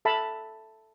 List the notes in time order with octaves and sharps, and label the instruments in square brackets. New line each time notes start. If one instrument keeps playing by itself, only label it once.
[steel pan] A4 E5 A5 B5